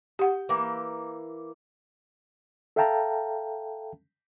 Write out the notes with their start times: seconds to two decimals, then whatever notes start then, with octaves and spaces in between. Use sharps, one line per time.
0.19 G4 F#5 G5
0.49 E3 A#3 G5
2.76 A4 E5 F5 G5 A5 A#5